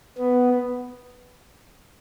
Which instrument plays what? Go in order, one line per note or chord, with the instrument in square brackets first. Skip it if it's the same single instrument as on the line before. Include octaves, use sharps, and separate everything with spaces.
[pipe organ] B3